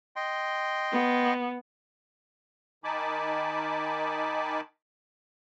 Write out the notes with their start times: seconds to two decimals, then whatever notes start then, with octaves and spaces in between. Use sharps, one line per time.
0.16 D#5 G5 C6
0.92 B3
2.84 D#3 D#4 G#5 A5 B5 D6